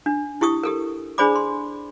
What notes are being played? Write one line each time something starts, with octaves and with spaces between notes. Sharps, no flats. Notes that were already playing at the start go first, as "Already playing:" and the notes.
D4
E4 G4 C#6 D#6
G4 A4 A#4
D4 G#4 C5 D5 B5 D6
C6